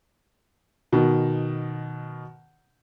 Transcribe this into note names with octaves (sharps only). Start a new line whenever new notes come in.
B2 D#3